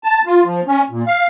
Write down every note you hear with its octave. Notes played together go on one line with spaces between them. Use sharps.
A5
F4
F3
C#4
A#2
F5